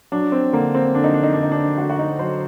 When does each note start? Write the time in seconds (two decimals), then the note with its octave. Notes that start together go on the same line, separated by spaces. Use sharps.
0.12 F#3 D4
0.32 C4
0.53 D3 A#3
0.75 C4
0.95 D3 D4
1.04 D#4
1.14 D4
1.24 D#4
1.33 D3 D4
1.43 D#4
1.52 D4
1.78 A3 F#4
1.90 F#4
1.99 D#4
2.19 F#3 C5